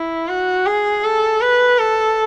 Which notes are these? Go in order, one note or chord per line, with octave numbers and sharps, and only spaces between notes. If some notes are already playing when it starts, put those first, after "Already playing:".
Already playing: E4
F#4
G#4
A4
B4
A4